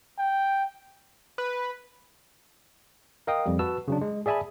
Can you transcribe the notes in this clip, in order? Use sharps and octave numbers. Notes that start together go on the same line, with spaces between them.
G5
B4
A#4 D#5 F5 G5 D#6
F2 G3
F#4 B4 A5 E6
C#3 F#3 D4
G#3
G#4 D5 E5 G#5 A5 B5